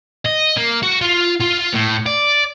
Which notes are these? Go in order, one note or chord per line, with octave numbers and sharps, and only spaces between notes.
D#5
A#3
F#4
F4
F4
A2
D5